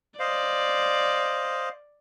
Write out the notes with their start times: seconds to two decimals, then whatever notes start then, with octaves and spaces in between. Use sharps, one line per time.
0.20 C5 D5 D#5 F5